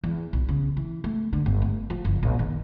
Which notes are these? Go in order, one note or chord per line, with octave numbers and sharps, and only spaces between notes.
E2
B1
C#3
E3
A3
D3
G1
A3
F3
F#1
A#1
D#3